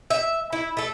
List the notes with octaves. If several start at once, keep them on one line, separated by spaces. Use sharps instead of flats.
E5
E4
A3 A4